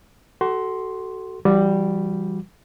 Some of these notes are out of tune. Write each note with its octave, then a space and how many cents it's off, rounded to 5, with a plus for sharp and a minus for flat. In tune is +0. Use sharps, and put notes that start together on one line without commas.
F#4 +30 A4 +0 C6 +0
E3 +40 G3 +0 F#4 -25